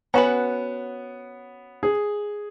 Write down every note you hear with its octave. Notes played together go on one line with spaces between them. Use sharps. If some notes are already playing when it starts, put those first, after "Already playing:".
B3 C#4 F#4 B4
G#4